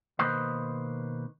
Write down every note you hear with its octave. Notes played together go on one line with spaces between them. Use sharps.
B2 D#3 A#3 B4 C5 D#5